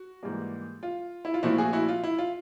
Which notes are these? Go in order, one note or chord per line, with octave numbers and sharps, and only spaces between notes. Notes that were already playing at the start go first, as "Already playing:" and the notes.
Already playing: F#4
G#2 E3 G3 A#3
F4
E4
F4
A#2 F3 A3 C4 E4 F#4
F#4 G#4
E4 F#4
F4
E4
F4